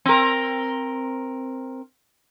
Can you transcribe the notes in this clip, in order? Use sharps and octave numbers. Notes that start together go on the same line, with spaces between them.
C4 A#4